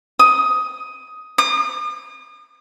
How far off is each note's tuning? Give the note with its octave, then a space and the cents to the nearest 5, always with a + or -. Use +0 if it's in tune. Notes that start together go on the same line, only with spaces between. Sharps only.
D#6 +10
D#6 -45